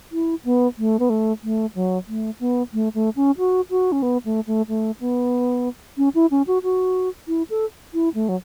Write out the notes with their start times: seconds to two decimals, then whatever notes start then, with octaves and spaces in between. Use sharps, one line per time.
0.12 E4
0.45 B3
0.78 A3
0.99 B3
1.10 A3
1.43 A3
1.75 F#3
2.08 A3
2.40 B3
2.73 A3
2.94 A3
3.16 C#4
3.38 F#4
3.70 F#4
3.92 C#4
4.02 B3
4.25 A3
4.47 A3
4.68 A3
5.00 B3
5.97 C#4
6.15 E4
6.31 C#4
6.47 F#4
6.63 F#4
7.28 E4
7.50 A4
7.94 E4
8.14 A3
8.29 F#3